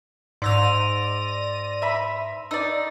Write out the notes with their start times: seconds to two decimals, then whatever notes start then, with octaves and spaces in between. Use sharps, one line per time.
0.42 G#2 D5 C6 E6 A#6 D#7 F7
1.82 E5 B5
2.51 D#4 D5 E6